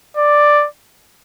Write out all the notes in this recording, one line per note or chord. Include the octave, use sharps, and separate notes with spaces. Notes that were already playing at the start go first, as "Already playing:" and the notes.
D5